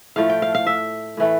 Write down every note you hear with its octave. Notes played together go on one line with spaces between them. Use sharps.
A2 F3 A3 F5
G5
F5
F5
E5
A2 E3 A3